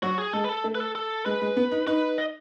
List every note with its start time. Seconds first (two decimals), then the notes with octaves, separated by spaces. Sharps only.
0.03 F#3 F#4
0.18 G#4
0.33 G#3 A4
0.44 B4
0.49 A4
0.64 A3
0.75 B4
0.80 A4
0.95 A4
1.26 G#3 B4
1.42 G#3
1.56 B3
1.72 D#4
1.87 D#4 B4
2.18 D#5